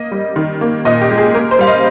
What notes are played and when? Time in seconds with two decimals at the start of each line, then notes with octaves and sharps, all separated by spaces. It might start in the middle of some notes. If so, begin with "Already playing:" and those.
Already playing: A#3 D#5
0.11 G3
0.36 D#3
0.61 A#3
0.85 A#2 D#5
1.01 G4
1.10 G#3
1.18 G#4
1.35 A#3 A#4
1.51 C5
1.59 G3 F5
1.67 D#5